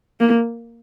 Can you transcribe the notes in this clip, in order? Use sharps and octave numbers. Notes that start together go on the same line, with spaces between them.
A#3